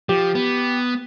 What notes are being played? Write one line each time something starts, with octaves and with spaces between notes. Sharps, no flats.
F3 G4
B3